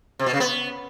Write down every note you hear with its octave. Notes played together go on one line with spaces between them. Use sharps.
C3
B2
C#3
B3